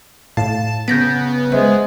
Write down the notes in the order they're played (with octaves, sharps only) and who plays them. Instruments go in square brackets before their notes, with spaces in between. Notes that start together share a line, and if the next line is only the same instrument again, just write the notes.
[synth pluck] A2 [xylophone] F5 [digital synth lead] A5
[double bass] C#3 [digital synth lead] B3 [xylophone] G6 A#6 B6 [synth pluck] D7
[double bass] G#3 [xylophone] B4 C5 E5